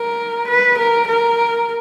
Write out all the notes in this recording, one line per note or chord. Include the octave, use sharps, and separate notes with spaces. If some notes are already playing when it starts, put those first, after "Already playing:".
Already playing: A#4
B4
A#4
A#4